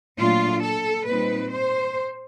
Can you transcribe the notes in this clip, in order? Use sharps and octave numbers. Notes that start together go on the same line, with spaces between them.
A#2 F#3 A3 D4 F4
A4
A#2 G3 C4 D#4 B4
C5